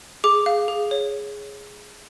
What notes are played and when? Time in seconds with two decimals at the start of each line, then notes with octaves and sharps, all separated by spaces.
0.24 G#4 D6
0.46 F5
0.68 G#4
0.91 C#5